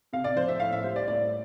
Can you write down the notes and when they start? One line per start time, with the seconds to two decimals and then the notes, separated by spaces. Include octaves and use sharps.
0.13 C3 F5
0.24 D5
0.36 F3 C5
0.48 E5
0.60 A2 F5
0.72 E5
0.84 G3 C5
0.96 D5
1.08 A2 D5